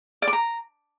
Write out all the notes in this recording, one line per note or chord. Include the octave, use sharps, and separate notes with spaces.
D5
D6
A#5